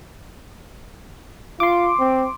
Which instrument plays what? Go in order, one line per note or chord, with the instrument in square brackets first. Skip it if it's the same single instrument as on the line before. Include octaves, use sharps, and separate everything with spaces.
[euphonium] F4 [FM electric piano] C6 D6
[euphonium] C4